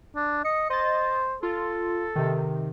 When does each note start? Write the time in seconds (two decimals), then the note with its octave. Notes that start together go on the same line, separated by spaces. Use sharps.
0.15 D4
0.45 D#5 C#7
0.70 C5 D#5 A6
1.43 F4 A4
2.16 C3 D#3